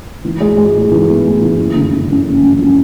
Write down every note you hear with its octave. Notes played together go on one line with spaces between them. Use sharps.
E3
G#3
G#3
A2
E3
B3
A2
E3
F#1
D3
D3
F#2
F#1
F#2
F3